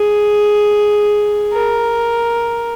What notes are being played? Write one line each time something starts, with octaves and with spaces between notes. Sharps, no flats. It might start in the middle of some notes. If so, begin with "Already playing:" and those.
Already playing: G#4
A#4